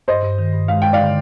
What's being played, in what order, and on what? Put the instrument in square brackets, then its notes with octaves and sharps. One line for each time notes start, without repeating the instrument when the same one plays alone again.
[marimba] G2 [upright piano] C5 D#5
[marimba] G2
D#3
G2
[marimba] G#3 [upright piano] F5
[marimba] G#3 [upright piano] G5
[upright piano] D5 F5
[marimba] D3